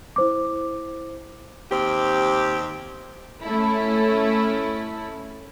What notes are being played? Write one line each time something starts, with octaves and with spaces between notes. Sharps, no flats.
E4 C5 D6
D#2 C4 G4
A3 C#4 E4 A4